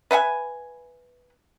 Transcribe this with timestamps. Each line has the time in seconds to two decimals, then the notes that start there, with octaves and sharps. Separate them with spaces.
0.11 B4 E5 F#5 G#5